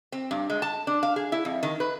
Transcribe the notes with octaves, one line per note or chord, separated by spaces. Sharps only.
C4
G2
G#3
A5
D4
F5
G#4
E4
F2
D#3
B4